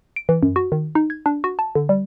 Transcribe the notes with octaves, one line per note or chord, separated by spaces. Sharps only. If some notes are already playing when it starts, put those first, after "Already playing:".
D7
E3
F#2
F#4
D#3
D#4
G#6
D4
F#4
A5
D3
G3